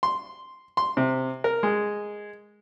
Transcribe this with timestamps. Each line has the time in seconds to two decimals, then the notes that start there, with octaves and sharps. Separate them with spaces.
0.03 C6
0.77 C6
0.97 C3
1.44 A#4
1.63 G#3